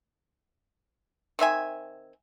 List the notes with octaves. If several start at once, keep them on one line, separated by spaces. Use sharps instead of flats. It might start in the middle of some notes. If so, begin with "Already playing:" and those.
D#3 C4 E5 G#5